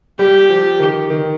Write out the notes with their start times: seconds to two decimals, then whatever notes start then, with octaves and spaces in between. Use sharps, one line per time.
0.19 G3 G4
0.49 F3
0.79 D#3
1.10 D#3